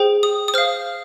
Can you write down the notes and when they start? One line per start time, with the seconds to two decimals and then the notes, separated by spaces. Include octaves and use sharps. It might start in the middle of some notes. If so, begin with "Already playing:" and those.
Already playing: G#4 C5 G5
0.23 D#6
0.48 D#6
0.54 C5 F5 F6